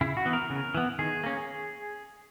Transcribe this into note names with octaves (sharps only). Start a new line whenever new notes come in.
C#3 E4
F#4
E3 B3
A#4
C#3
E3 B3
D#3 G#4
A#3 C#4